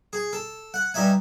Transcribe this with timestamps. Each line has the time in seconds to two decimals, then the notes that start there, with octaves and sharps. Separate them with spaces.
0.13 G#4
0.33 A4
0.74 F#5
0.94 G2 D#4 E5 G#5